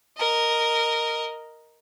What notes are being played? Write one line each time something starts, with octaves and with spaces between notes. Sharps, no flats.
A#4 D#5